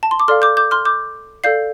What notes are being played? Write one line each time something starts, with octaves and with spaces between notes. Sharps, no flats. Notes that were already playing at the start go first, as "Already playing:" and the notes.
A5
C6
D6
A4 D5 F5 C6 F6
D6 G6
D6 G6
C6 F6
D6 G6
A4 D5 F5 G6 C7